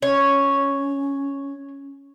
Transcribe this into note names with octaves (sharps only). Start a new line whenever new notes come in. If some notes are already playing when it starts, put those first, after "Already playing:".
C#4 C#5